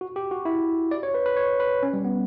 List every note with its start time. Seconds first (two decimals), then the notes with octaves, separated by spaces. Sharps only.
0.01 F#4
0.16 G4
0.31 F#4
0.45 E4
0.91 D5
1.03 C#5
1.14 B4
1.26 B4
1.37 C#5
1.60 B4
1.83 C#4
1.93 G3
2.04 B3